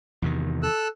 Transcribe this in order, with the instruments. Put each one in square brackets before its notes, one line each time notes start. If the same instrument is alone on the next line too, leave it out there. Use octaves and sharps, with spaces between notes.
[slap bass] E2 C3 D#3
[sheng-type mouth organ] A4 E6 F#6